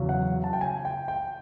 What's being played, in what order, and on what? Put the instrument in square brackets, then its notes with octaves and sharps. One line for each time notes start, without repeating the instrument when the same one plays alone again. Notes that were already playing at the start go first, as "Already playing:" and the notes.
Already playing: [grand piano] E2 C#3 F#3
F#5
A5
G5
G#5
G5
G5